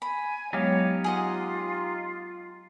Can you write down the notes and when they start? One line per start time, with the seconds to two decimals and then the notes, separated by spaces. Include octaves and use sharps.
0.02 G#5 B5
0.53 F#3 G#3 B3 D#4 G4 C#5 F5
1.04 F4 G#4 D#5 F#5